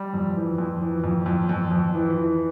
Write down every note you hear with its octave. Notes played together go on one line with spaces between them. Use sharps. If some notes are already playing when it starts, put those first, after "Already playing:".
Already playing: G3
F2
E3
F2
E3
F2
F2
F2
F2
E3
E3